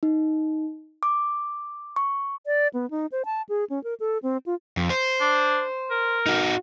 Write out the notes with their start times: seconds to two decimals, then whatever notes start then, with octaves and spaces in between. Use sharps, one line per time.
0.03 D#4
1.03 D6
1.96 C#6
2.46 D5
2.74 B3
2.91 D#4
3.12 C5
3.25 A5
3.49 G#4
3.70 C#4
3.84 A#4
4.00 A4
4.23 C4
4.46 F4
4.77 F2
4.90 C5
5.21 D4
5.91 A#4
6.26 D#4 F#4